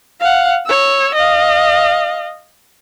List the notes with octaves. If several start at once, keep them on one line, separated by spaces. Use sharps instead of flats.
F5 F#5
C#5 E6
D#5 F5